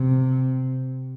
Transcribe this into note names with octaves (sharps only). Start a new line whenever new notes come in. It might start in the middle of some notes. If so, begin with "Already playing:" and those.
Already playing: C3